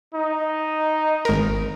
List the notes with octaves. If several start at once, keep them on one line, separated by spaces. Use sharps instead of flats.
D#4
G#1 A#4